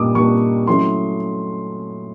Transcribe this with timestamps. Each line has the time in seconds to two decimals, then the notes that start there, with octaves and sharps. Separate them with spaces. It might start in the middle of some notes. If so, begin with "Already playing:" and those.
Already playing: A#2 G3 A#3 D4 D6 D#6
0.15 A#2 G3 A#3 D4 C#6
0.67 F#3 A3 C#4 E4 C6